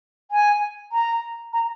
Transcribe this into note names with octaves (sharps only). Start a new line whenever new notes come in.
G#5
A#5
A#5